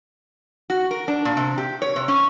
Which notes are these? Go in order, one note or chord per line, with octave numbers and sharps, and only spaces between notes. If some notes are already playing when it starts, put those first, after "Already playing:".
F#4
A#4
D4
A#2
C3
G4
C#5
C3
C#4